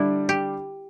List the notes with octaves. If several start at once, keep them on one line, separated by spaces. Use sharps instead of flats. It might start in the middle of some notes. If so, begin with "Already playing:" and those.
Already playing: D3 G3 D4 E4
G4